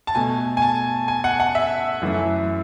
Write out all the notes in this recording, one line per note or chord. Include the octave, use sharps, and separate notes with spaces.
A5
B2 A3 G#5
G#5
A5
G#5
F#5
F#5
E5
F#2 E3 A3